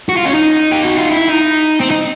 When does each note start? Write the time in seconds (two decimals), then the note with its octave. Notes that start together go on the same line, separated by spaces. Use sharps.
0.09 F#4
0.17 F4
0.25 C#4
0.35 D#4
0.72 G4
0.85 F#4
0.98 F4
1.11 E4
1.29 D#4
1.80 C4
1.91 D#4